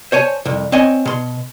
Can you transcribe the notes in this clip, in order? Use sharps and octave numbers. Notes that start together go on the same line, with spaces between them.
C5 C#5 G#5 A5
C2 F2
C4 C#5 D#5 G#5
B2 C6